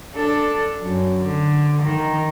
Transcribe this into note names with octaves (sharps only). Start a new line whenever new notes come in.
D4 A4
F#2
D3
D#3